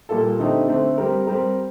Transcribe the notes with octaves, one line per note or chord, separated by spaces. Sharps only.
A#2 G3 A#3 F4 A4
D3 A3 C4 D#4 G4
D3 A3 C4
G3 C4 G4 A#4
G3 C4 G4 A#4